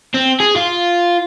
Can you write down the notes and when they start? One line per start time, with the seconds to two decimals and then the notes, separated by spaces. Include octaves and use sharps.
0.14 C4
0.40 G#4
0.56 F4